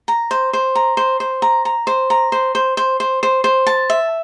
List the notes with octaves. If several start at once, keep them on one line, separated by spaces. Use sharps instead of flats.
A#5
C5
C5
A#5
C5
C5
A#5
A#5
C5
A#5
C5
C5
C5
C5
C5
C5
A5
E5